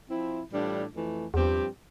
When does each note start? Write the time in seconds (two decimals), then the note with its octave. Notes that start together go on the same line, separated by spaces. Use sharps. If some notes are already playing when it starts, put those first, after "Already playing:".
0.08 F3 C4 E4
0.51 A2 E3 G3 D4 F4
0.93 F2 E3 A3
1.34 E2 G2 F3 C4 G4